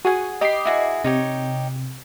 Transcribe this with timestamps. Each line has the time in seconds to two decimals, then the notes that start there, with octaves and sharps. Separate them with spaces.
0.05 F#4 G#4 F#5 G#5
0.41 G4 D#5 B5 D6 C7
0.65 E4 F#4 G#4
1.04 C3 D#4 G4 C#5